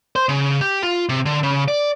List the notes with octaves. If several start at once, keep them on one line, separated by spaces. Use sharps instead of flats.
C5
C#3
G4
F4
C3
D3
C#3
D5